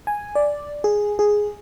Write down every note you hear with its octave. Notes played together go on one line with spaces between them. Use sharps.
G#5
D5
G#4
G#4